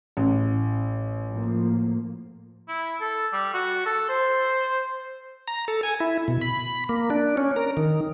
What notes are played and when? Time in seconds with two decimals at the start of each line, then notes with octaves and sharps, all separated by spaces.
0.17 A1
1.28 A2 F3 A#3
2.68 E4
3.00 A4
3.33 G3
3.54 F#4
3.86 A4
4.09 C5
5.47 A#5
5.68 A4
5.83 G#5
6.00 E4
6.28 B2
6.41 B5
6.89 A#3
7.10 D4
7.37 C#4
7.56 A#4
7.77 D#3